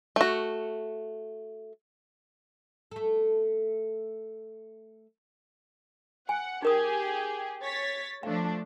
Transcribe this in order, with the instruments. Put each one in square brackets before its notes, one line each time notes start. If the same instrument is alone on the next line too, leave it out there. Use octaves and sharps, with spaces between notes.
[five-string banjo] A3 F#4
[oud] A3 A4
[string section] F#5 [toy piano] G#5
[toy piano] D#4 A#4 D#6 [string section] G4 G#4
[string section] C#5 A6 B6
[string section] F3 A3 D4 [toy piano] F5